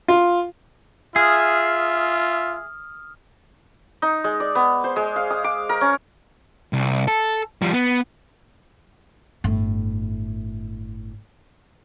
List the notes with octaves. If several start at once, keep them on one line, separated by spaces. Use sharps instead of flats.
F4
F4 G#4 E5 D#6 F6
D#4
G#3
D5
B3
C5
G#3
F5
D#6
D6
A#4
C#4
C2
A4
F3 G3
B3
G1 A2